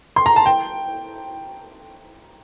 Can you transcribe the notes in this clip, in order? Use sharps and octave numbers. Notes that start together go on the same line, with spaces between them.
C6
A#5
A5
G5